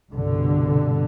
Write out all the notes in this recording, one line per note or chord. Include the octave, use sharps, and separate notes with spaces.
C2 G2 B2 D3